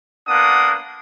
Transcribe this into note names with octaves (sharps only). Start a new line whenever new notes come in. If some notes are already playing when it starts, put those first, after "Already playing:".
A#3 B3 D4 F#5 D#6